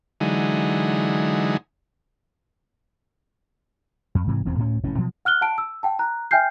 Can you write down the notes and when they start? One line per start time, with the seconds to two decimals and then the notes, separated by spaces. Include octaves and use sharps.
0.21 D3 E3 F#3 G#3 D#4
4.15 F2
4.27 G#2 C3 E3
4.45 E1 E2 G#2 C4
4.57 D2 A2 B3 C#4
4.83 F1 A2 E3 C#4
4.98 B2 F3 F#3
5.25 F#5 F6 F#6 G7
5.41 F#5 A5 D7
5.58 E6
5.83 F#5 G5 A5
5.99 A#5 F#6
6.31 E5 G5 G#5 F6 G6 C7